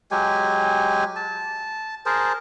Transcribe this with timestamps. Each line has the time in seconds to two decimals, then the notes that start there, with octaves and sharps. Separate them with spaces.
0.11 F#3 G#3 G4 G#5
1.16 A5
2.06 G#4 A#4 C5 A5